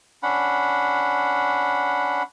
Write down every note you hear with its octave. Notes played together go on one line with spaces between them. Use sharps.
C#4 D4 F#5 B5